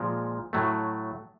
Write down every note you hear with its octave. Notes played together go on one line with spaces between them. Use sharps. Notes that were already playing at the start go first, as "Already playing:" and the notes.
Already playing: A#2 F3 G#3
A2 F#3 A3